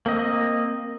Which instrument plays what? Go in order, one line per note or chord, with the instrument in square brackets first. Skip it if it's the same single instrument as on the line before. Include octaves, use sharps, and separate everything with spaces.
[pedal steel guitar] A#3 C4 D#5